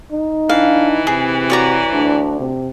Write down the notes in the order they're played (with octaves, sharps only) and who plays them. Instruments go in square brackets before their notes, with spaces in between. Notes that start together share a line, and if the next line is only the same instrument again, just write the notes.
[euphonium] D#4
[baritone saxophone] E3 [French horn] D4 [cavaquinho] F5
[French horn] C3 [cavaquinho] G#4
[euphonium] F#4 [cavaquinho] C#5 D5 A#5
[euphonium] D2 [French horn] D4
[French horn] C3